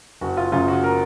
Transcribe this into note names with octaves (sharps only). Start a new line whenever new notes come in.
F#1 F#4
F4
F#2 C#3 F4
F#4
A#4